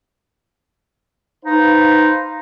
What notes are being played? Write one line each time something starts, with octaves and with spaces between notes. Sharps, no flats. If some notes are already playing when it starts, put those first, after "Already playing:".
D#4 B4 C5 F5